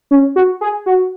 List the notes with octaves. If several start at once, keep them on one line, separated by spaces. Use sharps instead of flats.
C#4
F#4
G#4
F#4